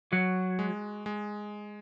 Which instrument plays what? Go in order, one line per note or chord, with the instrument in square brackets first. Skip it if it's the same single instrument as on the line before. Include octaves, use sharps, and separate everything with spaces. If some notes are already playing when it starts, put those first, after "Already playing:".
[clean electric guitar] F#3 [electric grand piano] F#4
[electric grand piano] G#3
G#3